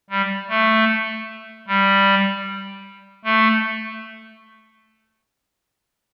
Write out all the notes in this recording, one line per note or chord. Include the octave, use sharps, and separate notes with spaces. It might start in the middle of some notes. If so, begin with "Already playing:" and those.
G3
A3
G3
A3